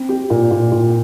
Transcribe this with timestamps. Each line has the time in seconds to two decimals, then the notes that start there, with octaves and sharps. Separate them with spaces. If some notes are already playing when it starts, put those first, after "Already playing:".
Already playing: C4
0.09 G4
0.30 A#2
0.51 A#2
0.72 A#2